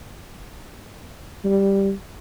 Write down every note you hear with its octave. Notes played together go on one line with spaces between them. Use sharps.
G3